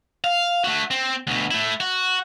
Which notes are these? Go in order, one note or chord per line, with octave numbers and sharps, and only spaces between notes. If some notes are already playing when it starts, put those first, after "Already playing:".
F5
A3 F#4
C4
D2 B2
A3 E4
F#4